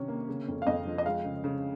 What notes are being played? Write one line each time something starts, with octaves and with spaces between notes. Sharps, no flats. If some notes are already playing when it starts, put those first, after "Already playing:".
Already playing: C3 D#3 C#4
A#3
C#3
F2
F5
F2 D#5
F3
D#5
G#3 F5
C#3
C#3